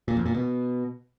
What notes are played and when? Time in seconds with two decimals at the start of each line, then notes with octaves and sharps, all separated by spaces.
0.08 A#2
0.17 F2
0.26 A#2
0.34 B2